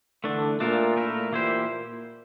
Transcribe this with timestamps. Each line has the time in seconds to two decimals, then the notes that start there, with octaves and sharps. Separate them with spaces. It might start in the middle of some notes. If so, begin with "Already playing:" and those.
0.24 D3 E3 A3 D4
0.60 A#2 A3 D4 F4 A#4
0.97 A3 E4 A#4
1.32 A#2 E3 A#3 E4 G4 C5